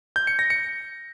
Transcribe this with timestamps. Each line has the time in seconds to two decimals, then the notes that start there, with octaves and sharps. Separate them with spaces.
0.16 G6
0.27 C#7
0.39 A#6
0.50 C#7